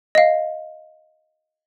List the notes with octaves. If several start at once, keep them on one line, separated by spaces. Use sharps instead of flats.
D#5 F5